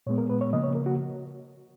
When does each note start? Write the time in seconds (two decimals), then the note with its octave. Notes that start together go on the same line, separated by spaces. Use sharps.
0.06 A#2 G#3 B3 C#5
0.18 A#4
0.29 B4
0.41 C#5
0.53 C#3 F3 A#3 D#5
0.64 C#5
0.75 A#4
0.86 F#4